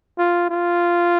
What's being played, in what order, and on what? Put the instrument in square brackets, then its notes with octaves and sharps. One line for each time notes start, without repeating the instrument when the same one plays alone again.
[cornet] F4
F4